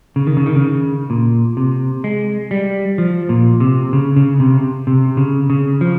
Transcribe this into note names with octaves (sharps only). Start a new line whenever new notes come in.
C#3
D#3
C#3
D#3
C#3
A#2
C3
G#3
G3
F3
A#2
C3
C#3
C#3
C3
C3
C#3
C#3
F3